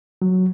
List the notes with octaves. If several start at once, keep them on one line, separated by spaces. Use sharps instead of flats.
F#3